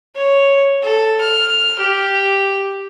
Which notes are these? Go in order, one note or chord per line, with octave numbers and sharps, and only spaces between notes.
C#5
A4
F6
G4